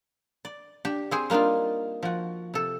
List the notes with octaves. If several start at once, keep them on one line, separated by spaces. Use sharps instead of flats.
D5
D4 G4
C4 G#4 C5
G3 A#3 D4 D#4 F4
F3 F#4
C3 A4